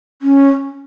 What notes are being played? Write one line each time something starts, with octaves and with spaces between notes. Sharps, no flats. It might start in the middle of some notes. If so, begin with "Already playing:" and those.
C#4